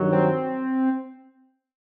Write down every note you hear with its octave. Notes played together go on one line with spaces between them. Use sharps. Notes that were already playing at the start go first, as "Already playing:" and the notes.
Already playing: G2 D#3 F#3
C4